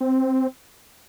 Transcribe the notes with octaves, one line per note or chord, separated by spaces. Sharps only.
C4